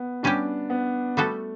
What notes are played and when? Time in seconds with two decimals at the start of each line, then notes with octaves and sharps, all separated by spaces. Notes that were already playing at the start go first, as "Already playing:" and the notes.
Already playing: B3
0.23 G3 C#4 D4 G4
0.70 B3
1.17 G3 A3 B3 F#4 A4